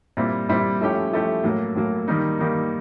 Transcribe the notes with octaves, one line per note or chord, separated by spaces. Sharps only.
A#2 G3 C4 E4
A#2 G3 C4 E4
F3 A3 C#4 E4 G4
F3 A3 C#4 E4 G4
A2 F#3 A#3
A2 F#3 A#3
D#3 G3 A#3 D#4
D#3 G3 A#3 D#4